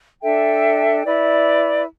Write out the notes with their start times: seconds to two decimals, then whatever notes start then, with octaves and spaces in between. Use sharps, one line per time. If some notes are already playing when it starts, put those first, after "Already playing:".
0.23 D4 A4 E5 G5
1.04 E4 B4 D5